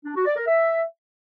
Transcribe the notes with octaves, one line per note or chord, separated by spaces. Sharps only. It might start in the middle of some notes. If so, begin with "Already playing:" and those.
D4
F#4
D5
A#4
E5